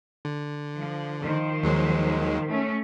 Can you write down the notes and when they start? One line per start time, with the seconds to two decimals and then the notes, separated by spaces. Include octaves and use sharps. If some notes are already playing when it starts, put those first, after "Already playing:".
0.25 D3
0.77 F3
1.22 D#3 F3 C5
1.63 D#2 F#3 G#3
2.48 A3 C#4